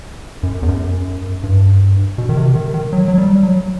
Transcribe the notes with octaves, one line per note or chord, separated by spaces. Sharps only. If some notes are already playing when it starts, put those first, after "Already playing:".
F#2
E2
F#2
G2
B2
D#3
C3
D#3
D#3
F#3
F#3
G3
F#3